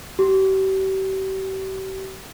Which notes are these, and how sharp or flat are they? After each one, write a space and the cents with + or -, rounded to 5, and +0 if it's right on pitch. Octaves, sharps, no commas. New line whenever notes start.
G4 -40